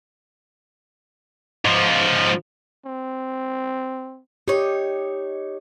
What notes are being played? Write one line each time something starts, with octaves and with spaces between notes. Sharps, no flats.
G#2 F3
C4
D#4 G4 C#5